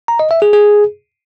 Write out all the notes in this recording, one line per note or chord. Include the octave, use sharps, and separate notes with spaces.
A#5
D#5
E5
G#4
G#4